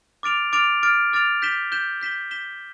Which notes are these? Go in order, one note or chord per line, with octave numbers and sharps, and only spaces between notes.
D6 F6 A6 D7 F7
D6 F6 A6 D7 F7
D6 F6 A6 D7 F7
D6 F6 A6 D7 F7
G6 B6 E7 G7
G6 B6 E7 G7
G6 B6 E7 G7
G6 B6 E7 G7